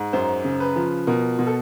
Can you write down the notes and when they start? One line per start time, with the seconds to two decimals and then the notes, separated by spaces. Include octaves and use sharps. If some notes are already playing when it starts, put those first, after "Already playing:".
Already playing: G#2
0.13 F#2 C5
0.45 C#3
0.60 B4
0.76 F3
1.07 B2 A#4
1.39 B2
1.47 A4